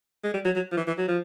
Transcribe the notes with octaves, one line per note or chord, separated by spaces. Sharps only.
G#3
G3
F#3
F#3
F3
E3
E3
F#3
F3